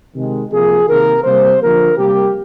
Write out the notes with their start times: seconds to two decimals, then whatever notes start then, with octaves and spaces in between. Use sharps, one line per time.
0.15 C3 D#3 G#3
0.51 C3 F3 A#3 G#4
0.88 C3 D#3 A#3 A#4
1.24 C3 G3 A#3 C5
1.61 D3 F3 A#3 A#4
1.98 C3 G3 A#3 G4